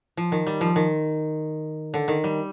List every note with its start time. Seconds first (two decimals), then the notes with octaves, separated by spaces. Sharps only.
0.17 F3
0.32 D#3
0.47 G3
0.61 F3
0.76 D#3
1.94 D3
2.08 D#3
2.24 G3